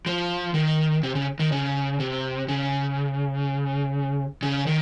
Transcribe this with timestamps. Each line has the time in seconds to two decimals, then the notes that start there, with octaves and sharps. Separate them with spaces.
0.06 F3
0.54 D#3
1.03 C3
1.15 C#3
1.39 D#3
1.52 C#3
2.00 C3
2.49 C#3
4.43 C#3
4.67 D#3